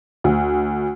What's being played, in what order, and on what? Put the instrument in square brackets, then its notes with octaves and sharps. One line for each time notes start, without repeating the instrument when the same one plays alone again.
[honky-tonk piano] D2